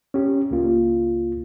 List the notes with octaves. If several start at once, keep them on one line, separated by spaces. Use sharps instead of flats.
C#4 G4
C#2 A#3 F4